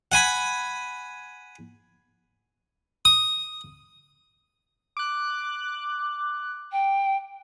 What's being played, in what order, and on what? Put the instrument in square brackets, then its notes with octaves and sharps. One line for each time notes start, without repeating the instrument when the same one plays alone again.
[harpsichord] F#5 G#5 B5
D#6
[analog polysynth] D6 F#6
[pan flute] G5